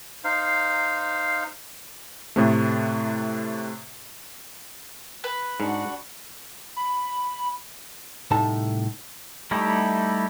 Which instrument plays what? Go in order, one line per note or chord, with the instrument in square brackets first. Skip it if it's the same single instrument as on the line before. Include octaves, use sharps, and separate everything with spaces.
[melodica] D#4 C5 F5
[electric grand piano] A2 C3 A3
[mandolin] B4
[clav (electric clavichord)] G#2 [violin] D4 F#4
[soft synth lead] B5
[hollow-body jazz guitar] C2 A2 A3 D#4 A5
[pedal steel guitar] G3 A3 D#4 E4 G4